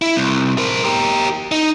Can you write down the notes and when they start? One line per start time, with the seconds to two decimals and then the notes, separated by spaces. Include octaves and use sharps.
0.02 E4
0.16 C2
0.58 A#4 C5
0.85 G4 A#4
1.52 D#4